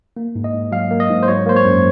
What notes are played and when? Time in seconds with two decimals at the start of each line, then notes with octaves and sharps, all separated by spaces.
0.17 A#3
0.35 G#2
0.44 D#5
0.54 G#2
0.72 F#3 F5
0.91 A#3
1.00 D#5
1.09 G#2
1.23 C5
1.28 F#3 C#5
1.46 A#3 C5
1.56 C#5
1.65 F#2